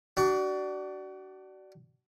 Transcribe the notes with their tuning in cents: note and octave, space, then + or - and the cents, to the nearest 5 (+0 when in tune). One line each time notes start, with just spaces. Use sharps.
D4 +0 F#4 +35